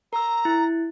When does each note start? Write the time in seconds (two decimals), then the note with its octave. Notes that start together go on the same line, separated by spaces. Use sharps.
0.13 A#4 A#5 E6
0.45 E4